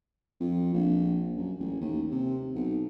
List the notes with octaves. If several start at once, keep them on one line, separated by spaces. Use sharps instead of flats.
F2
A#1
F#2
A1
D#2
C3
B1